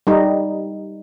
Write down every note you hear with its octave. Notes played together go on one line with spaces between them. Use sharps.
G3 D#4